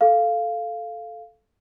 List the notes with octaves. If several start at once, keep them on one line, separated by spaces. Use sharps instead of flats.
A4 F5